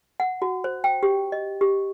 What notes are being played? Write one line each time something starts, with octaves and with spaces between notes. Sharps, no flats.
F#5
F#4
C5
G5
G4
D#5
G4